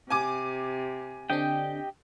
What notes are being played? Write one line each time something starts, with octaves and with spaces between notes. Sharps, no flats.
C3 G#5 D6
D3 C4 D4 G4 D#5 G5